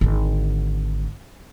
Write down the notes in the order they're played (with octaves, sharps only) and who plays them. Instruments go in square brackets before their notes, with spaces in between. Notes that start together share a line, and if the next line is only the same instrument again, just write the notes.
[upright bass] G#1 D3